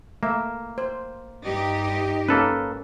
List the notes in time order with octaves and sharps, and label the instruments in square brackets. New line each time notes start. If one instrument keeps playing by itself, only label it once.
[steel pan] A3 E5 [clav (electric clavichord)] A#3
[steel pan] C5
[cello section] G2 D#4 G4
[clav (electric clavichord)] A#3 A4 B4 [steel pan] C#4